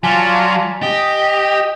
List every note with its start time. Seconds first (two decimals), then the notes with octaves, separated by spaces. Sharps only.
0.04 F#3 F4 D5 G#5 A5 B6 G7
0.83 G4 D#5